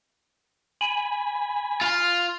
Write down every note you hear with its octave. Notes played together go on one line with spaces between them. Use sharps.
G#5 B5
F4 F5